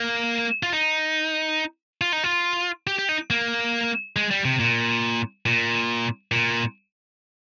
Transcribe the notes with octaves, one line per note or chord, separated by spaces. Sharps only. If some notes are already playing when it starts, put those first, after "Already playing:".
Already playing: A#3
F4
D#4
F4
D#4
F4
G4
G4
D#4
A#3
G#3
G3
C3
A#2
A#2
A#2